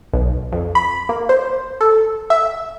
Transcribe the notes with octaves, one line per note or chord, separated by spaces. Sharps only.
B1
F2
B5
A#3
C5
A4
E5